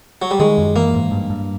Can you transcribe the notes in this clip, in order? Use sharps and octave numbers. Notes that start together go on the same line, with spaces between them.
F#3
G3
D#3 G#3
F#2
E3 A#3
G#2
G2
G2